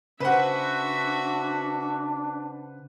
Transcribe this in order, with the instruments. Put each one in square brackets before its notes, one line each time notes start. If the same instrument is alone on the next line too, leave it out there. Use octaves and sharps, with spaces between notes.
[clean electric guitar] C#3 [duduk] D4 [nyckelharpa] F#4 E5 [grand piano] B4 C5 F#5